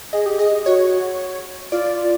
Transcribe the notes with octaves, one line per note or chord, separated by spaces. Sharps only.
G#4 D#5
G4
G#4 D#5
F#4 C#5
F4 D5